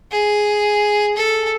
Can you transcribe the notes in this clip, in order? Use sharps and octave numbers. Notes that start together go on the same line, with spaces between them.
G#4
A4